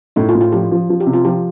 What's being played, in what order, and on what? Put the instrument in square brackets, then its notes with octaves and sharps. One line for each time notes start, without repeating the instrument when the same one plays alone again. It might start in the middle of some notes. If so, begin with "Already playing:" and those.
[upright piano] A2 [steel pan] D#4
[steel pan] F4
[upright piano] A2
[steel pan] F4
[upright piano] F3 [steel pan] G4
[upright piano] F3
F3
[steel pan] G4
[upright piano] C3
[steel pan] F4
[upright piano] F3 [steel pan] G4